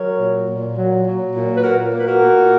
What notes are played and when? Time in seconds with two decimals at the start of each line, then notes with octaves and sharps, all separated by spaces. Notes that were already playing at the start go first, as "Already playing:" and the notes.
Already playing: F#3 A#4 C#5
0.18 A#2
0.48 A#2
0.77 F#3
1.06 F#3
1.35 A#2
1.55 B4
1.63 A#2 F#4 A#4
1.92 A#3 B4
2.07 F#4 A#4
2.21 A#2